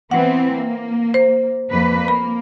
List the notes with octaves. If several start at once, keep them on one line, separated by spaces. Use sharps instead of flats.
E3 B3 C4 F#5
A#3
C5
F2 A#3 B4
A#3 B5